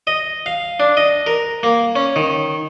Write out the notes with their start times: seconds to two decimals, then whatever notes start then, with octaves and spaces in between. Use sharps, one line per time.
0.07 D#5
0.46 F5
0.80 D4
0.97 D#5
1.26 A#4
1.63 A#3
1.96 C#4
2.16 D#3